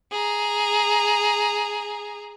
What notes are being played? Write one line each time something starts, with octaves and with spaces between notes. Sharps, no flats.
G#4 A#5